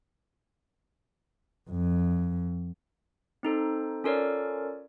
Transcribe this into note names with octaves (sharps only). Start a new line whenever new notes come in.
F2
C4 D#4 A4 C5
C#4 F4 A4 A#4 C#5 D5